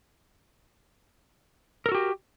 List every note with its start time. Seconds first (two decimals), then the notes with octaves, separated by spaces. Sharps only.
1.86 A#4
1.89 A4
1.92 F#4
1.95 G4